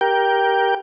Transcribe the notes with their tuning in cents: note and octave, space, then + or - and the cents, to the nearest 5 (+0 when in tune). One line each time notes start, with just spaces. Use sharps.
G4 +0 A#4 +15 G5 +0